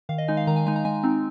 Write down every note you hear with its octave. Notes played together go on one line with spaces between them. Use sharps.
D#3 F5
D#5
G#3 D#4 G#5
F5
D#3 A#5
G#5
G#3 D#4 G#5
A#5
G#3 G#5
C4 D#4